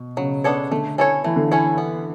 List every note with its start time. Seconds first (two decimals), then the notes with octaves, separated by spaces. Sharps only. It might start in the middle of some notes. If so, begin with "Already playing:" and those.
Already playing: B2
0.17 C#3 F#3
0.44 B3 D4 A4 C#5
0.71 D3 A3
0.98 C#4 E4 A4 C#5
1.24 E3 A3
1.36 D3
1.48 E3 C#4 E4 A4 C#5
1.78 B3